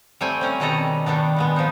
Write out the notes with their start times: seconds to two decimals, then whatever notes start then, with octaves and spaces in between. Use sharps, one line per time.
0.21 G3 A3 C4 G5 G#5
0.41 C4 C#4 A#5
0.60 B2 D#3 G3 A4 D#5 A#5
1.06 D#3 G3 B3 D4
1.36 A#2 G#3 B3
1.56 F3 D#4